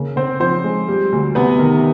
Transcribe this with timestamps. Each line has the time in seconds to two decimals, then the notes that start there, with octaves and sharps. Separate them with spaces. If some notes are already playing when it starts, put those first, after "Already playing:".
Already playing: C#3 A#3
0.16 C#3 C4 C5
0.40 F3 C4 C5
0.64 G#3
0.88 G3
1.12 D2
1.35 C3 B3 B4
1.59 D#3